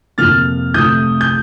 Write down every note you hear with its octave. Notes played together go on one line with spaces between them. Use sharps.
F2 C3 F3 A#3 F6 A6
C3 F3 A3 D#6 G6
G6